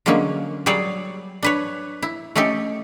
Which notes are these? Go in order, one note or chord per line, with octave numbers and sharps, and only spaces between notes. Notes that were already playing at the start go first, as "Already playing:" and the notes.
D3 F#3 G#3 A#3 C#4
F#3 G3 G#4 C#5 D5
D4 B4 C#5
E4
A3 C#4 D#4 G4 A4